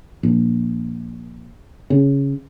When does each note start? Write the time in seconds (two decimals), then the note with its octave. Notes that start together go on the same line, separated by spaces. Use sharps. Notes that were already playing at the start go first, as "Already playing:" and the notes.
0.23 A#1
1.90 C#3